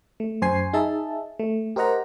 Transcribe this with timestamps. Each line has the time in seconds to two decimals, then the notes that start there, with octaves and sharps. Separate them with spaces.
0.20 A3
0.42 F#2 C5 G#5 C7
0.73 D#4 G#4 E5 A5
1.39 A3
1.76 G4 A#4 C5 D#5 F#5 A#5